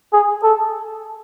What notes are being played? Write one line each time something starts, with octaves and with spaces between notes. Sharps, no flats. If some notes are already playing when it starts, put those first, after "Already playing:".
G#4
A4